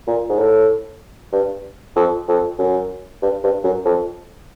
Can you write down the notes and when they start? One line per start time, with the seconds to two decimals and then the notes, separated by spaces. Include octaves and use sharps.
0.07 A#2
0.29 G#2
0.39 A2
1.33 G2
1.96 F2
2.28 F2
2.59 F#2
3.22 G2
3.44 G2
3.64 F#2
3.85 F2